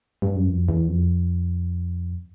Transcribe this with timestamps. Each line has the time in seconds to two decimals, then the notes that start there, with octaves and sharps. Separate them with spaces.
0.22 G2
0.36 F#2
0.49 F2
0.69 E2
0.88 F2